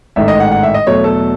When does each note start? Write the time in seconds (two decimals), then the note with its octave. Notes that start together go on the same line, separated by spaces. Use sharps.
0.16 A1 G#2 D#3 A3 E5
0.28 D#5
0.40 F#5
0.51 F#5
0.63 E5
0.74 D#5
0.87 E2 B2 F#3 A3 C#5
1.04 A4